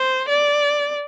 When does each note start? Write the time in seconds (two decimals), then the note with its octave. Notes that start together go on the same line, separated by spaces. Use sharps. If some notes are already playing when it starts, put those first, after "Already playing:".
Already playing: C5
0.29 D5